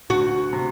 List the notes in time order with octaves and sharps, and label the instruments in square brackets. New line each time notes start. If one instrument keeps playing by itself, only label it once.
[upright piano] D2 [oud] F#4
[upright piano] C3